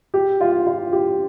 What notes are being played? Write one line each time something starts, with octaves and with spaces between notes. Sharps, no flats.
G4
F4
F4
G4